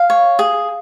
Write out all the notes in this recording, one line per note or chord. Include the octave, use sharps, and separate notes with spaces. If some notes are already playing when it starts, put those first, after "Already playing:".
Already playing: F5
C#5
G#4